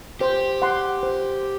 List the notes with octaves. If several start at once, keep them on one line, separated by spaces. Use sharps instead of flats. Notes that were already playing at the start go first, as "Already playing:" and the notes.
G4 C5
F#5 C6
C5